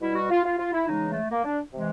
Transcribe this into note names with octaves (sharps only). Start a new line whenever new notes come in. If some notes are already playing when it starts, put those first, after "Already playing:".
B2 G3 E4
F#4
F4
F4
F4
E4
C#3 E3 G#3 D#4
A3
A#3
D4
C3 E3 G#3